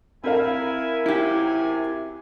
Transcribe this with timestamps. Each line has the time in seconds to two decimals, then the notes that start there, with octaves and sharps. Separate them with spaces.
0.24 C4 E4 A#4 F5 G#5
1.06 F#2 C3 E4 G4 G#5